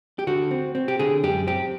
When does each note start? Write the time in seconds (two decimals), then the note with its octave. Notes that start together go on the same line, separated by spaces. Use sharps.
0.19 G4
0.27 D3 F#4
0.51 C4
0.75 C4
0.88 G4
0.99 D3 G#4
1.23 F#2 G4
1.47 C4 G4